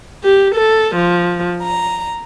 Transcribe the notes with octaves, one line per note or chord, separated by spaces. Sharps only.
G4
A4
F3
A#5